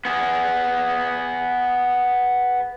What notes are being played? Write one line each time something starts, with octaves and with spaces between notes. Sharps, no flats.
B3 G#4